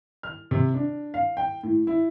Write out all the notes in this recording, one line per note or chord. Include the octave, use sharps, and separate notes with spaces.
F6
C3
D4
F5
G5
A2
E4